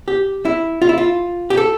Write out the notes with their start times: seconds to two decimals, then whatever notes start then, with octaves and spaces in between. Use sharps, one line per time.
0.08 G4
0.45 E4
0.82 F4
0.89 E4
0.98 F4
1.50 G4
1.57 A4